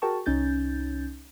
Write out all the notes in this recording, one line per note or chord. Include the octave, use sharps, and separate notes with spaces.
F#4 G#4 A#4 G5 A5 C#6
C2 C#4 D#4 G6 A6